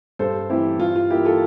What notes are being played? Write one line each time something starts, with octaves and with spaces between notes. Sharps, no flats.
G2 A4 C5
E3 A3 C4 E4 G4
G2 F4
F4
E3 A#3 E4 G4
F4 A4